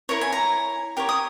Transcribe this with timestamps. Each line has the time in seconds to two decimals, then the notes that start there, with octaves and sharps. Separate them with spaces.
0.09 E4 A#4 C#5 A#5
0.21 G#5
0.33 A#5
0.97 G4 A#4 C#5
1.09 D#6